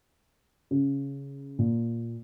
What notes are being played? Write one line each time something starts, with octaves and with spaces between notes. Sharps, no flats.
C#3
A#2